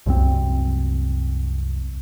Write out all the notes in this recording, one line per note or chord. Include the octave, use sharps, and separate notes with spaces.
C2 F#2 E3 C4